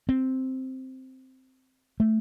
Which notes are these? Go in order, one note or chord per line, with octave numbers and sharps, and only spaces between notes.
C4
A3